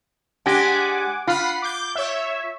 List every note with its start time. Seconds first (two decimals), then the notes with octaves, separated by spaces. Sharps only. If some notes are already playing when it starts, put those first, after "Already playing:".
0.46 G#3 D4 G4 F#5 G#5 D6
1.27 F4 F#5 B5 C7
1.62 D6 G6
1.95 C#5 E5